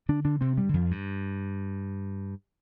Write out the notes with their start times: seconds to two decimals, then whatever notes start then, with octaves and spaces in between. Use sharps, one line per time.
0.09 D3 D4
0.25 D3 D4
0.41 C3 C4
0.58 G2 G3
0.69 D3
0.74 F2 F3
0.91 G2